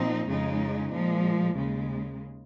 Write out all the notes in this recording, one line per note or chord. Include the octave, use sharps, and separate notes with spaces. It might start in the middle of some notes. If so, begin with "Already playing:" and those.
Already playing: A#2 F3 C4 D#4
F2 C#3 G#3 D#4
A#2 F3 G#3
D#2 C#3 G#3